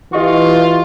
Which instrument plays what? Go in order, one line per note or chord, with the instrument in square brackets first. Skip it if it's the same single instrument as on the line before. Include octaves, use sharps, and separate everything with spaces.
[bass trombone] E3 [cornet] F4 [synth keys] G4 D#5 C#6